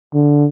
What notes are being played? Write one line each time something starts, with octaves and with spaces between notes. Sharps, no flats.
D3